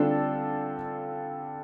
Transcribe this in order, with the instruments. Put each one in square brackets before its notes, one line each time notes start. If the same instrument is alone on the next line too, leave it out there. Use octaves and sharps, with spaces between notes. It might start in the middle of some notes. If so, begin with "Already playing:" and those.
Already playing: [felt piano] D3 G3 C4 F4 A4 [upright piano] D4